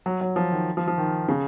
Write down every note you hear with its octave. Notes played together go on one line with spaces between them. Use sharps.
F#3
F#3
F3
D#3
F3
F3
D#3
C#3